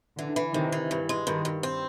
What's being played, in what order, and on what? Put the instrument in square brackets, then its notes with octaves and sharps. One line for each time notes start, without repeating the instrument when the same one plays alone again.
[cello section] D3 [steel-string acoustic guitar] E3
[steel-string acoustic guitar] E3
[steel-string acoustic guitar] C3 [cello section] D#3
[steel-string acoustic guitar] E3
G2
G#3
[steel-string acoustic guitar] G2 [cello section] D#3
[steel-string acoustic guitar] G2
C4